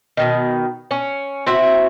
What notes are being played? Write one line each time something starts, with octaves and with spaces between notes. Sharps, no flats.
B2 D#3
C#4
C4 E4 F#4 E5